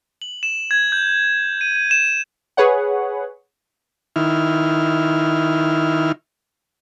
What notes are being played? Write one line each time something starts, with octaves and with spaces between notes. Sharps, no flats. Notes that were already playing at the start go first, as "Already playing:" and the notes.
F#7
E7
G#6
G6
D#7
D#7
E7
G#4 B4 C#5 F#5
D#3 E4 F6